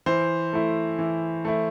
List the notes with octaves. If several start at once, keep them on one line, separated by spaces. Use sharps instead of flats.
E3 C5
A3 E4
E3
A3 E4